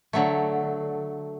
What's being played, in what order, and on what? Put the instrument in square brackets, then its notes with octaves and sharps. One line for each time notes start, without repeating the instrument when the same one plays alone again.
[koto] D3 F#3 A3